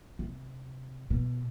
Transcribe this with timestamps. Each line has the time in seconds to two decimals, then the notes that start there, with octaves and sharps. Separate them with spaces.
0.19 C3
1.10 B2